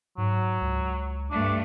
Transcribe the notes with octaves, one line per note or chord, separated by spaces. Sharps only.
G#2 F#3
C#2
G2 A3 D4